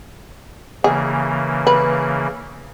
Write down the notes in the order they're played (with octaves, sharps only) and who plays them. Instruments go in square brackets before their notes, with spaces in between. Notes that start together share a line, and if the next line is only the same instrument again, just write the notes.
[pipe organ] C#3 E3 A#3 [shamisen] G#4
[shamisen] B4